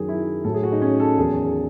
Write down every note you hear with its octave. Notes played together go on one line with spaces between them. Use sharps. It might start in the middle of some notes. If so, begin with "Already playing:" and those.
Already playing: F#2 D#3 F#3 G#4
E4
A2 F#3 A4
G#4
F#4
D#4
C#4
A4
E2 D#3 F#3 G#4